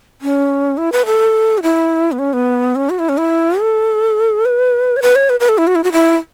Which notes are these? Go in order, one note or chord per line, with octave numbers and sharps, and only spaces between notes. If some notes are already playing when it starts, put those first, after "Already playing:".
C#4
E4
B4
A4
F#4
E4
B3
C#4
B3
C#4
F#4
E4
C#4
E4
A4
B4
C#5
B4
C#5
B4
B4
A4
E4
F#4
E4
F#4
E4